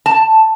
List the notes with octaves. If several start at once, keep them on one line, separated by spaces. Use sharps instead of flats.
A5